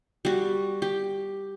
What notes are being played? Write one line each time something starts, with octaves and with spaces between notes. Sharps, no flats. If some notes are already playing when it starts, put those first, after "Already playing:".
G3 F#4
G4